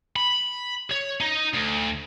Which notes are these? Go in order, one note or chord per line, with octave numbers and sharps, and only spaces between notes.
B5
C#5
D#4
D2